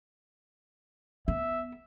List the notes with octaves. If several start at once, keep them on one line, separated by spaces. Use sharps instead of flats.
B3 E5